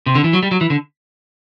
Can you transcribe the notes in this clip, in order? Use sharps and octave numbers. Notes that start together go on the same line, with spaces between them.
C3
D3
E3
F#3
G3
F#3
E3
D3